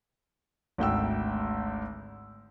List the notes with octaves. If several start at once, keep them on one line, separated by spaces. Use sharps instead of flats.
G#1 D2 G5 E6